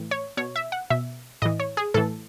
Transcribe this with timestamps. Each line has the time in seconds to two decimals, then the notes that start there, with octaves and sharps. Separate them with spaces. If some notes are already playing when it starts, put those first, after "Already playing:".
Already playing: A2 E3
0.11 C#5
0.37 B2 C#5
0.56 E5
0.72 F#5
0.90 B2 E5
1.42 A2 E3 D#5
1.60 C#5
1.77 G#4
1.94 A2 E3 A4